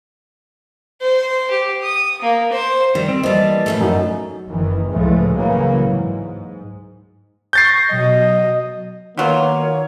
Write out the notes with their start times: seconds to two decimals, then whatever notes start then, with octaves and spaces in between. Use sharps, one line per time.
1.01 C5
1.50 G4
1.83 D#6
2.21 A#3
2.52 C5
2.95 D#3 G3
3.08 C4
3.23 E3 G3 A#3 D#5 A5
3.66 A2 C#3 A3
3.81 F#2 D#4
4.49 F#1 D#3 E3
4.91 C#2 A2 E3 F3 G#3 A3
5.34 C#3 E3 F#3 A#3
5.85 G#2
7.53 C#6 G6 A6 A#6 C7
7.91 B2 F#3 D#5
9.17 B2 D#3 F#3 A#3 F4 C#5